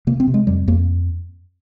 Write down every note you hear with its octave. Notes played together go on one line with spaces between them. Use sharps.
C3 A#3
C4
C3
G#3
F2 G3
F2 A#3